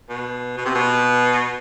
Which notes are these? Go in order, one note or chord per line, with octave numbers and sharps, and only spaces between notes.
B2
B2
C3
B2